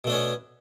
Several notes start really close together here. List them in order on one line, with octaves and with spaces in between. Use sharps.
B2 A3 D4 C#4 B3